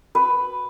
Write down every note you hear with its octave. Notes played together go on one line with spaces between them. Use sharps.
B4